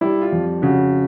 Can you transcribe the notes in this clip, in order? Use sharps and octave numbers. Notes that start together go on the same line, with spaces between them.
G3 E4
F4
F2
C#3 F#4